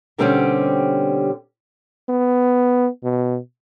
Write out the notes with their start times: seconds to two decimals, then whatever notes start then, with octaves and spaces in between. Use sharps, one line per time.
0.18 B2 D3 G3 C4 C#4 G4
2.09 B3
3.04 B2